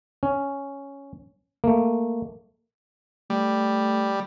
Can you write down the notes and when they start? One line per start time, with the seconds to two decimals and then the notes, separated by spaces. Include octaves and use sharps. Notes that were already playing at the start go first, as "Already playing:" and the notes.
0.23 C#4
1.64 A3 A#3
3.30 G3 A3